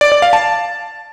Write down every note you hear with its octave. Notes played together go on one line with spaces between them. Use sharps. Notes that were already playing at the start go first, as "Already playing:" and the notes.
D5
D5
F5
A5